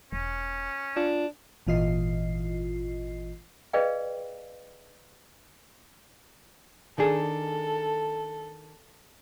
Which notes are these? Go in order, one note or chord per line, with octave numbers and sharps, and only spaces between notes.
E1 C#4
D4 F4
G#1 A#2 E3 F4 D#5 C7
G#4 B4 D5 D#5 F5 G5
D#3 D4 G#4 A4